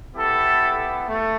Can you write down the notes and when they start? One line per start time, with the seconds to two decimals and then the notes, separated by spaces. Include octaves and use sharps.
0.15 B3 E4 G4 A4
1.08 A3